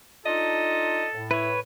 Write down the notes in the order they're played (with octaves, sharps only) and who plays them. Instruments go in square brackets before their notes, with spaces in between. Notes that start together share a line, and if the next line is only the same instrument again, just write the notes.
[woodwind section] D4 D#4 F4 [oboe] A4 [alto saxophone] D#5
[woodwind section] A2
[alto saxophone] E4 [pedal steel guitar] B4 C#5